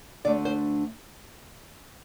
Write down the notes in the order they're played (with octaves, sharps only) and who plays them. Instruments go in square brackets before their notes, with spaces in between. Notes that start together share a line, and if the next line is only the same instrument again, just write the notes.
[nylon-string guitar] D2 D3 A3 D4 D5
C5